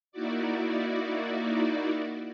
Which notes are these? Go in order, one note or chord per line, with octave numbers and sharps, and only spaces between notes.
A#3 D#4 E4 F#4 D5